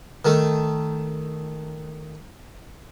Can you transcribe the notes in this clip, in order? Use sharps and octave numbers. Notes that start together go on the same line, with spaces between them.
D#3 A3